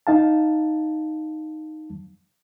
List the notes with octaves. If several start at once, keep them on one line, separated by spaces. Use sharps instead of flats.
D#4 F5 A5